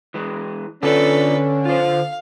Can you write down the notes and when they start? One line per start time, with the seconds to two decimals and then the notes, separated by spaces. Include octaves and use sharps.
0.14 E3 G#3
0.83 D3 C#4 D4 F4 A4 B4 D5
1.65 F4 C5 F5